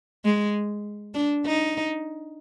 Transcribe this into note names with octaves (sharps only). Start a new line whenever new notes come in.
G#3
D4
D#4